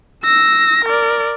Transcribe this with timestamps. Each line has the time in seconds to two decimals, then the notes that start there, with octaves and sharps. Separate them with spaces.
0.24 E6 A#6
0.85 A#4 D5